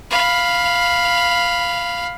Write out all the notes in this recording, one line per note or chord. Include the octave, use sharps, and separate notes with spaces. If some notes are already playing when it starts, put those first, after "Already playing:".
F5 B5